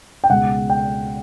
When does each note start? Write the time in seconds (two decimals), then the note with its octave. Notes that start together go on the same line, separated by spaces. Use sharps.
0.24 G5
0.30 C#2 B2 G#3 F#5
0.70 G5